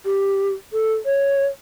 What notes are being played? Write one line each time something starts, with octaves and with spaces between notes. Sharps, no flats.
G4
A4
C#5